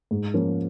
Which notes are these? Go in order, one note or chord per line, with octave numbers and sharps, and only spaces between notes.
G#2
F3 A#3 C#4